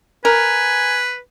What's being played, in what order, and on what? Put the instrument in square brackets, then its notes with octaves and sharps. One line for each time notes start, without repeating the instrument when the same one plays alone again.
[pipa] A#4 [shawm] B4 [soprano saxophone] G#5